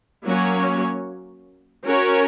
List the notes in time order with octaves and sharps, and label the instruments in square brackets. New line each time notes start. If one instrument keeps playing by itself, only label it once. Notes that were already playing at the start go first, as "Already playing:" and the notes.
[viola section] F#3 A#3 C#4 F#4 C#5
C#4 F#4 A#4 C#5